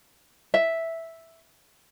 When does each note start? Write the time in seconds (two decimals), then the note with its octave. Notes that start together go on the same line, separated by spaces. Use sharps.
0.54 E5